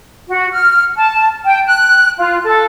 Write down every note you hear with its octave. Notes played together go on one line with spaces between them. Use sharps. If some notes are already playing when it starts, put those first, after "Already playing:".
F#4
F6
A5
G5
F#6
F4
A4